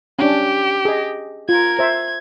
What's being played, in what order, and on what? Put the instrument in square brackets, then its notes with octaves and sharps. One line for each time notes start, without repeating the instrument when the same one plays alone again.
[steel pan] C#4 D4 [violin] G4
[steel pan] G#4 D#5
[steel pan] F4 [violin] A#4 G#6
[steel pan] C5 E5 [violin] G#6